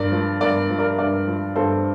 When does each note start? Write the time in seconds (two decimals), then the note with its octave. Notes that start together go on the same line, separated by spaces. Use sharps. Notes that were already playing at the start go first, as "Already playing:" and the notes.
Already playing: G2 A#4 D5
0.12 F3
0.41 G2 A#4 D5
0.70 F3
0.79 A#4 D5
0.99 G2 A#4 D5
1.27 F3
1.56 G2 A4 C5